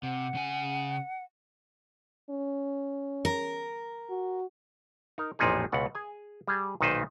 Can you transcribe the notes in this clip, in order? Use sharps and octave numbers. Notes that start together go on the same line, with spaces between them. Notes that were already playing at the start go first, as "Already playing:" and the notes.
C3 F#5
C#3 G#5
C#4
A#4
F#4
D#4 A#4
A1 F2 A#2 F3 D#4 G#4
C#2 B2 F#5
G#4 G#5
G3 G#4
B1 A#2 D#3 D#4 B4 C5